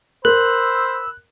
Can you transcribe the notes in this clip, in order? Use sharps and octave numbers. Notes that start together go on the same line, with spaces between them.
A#4 C5 B5 E6 F#6